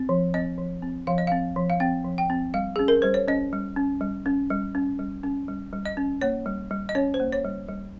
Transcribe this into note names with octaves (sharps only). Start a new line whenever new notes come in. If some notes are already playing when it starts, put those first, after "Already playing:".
Already playing: C4
F3
C4 D#5
F3
C4
F3 F5
D#5
C4 F5
F3
F5
C4 G5
F3
G5
C4
G3 F5
C#4 G#4
A#4
G3 C5
C#5
C#4 D#5
G3
C#4
G3
C#4
G3
C#4
G3
C#4
G3
G3
D#5
C#4
A#3 C#5
G3
G3
D#5
C#4 C#5
C5
A#3
C#5
G3
G3